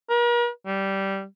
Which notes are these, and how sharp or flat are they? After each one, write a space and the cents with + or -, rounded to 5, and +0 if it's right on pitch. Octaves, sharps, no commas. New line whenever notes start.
A#4 +45
G3 -10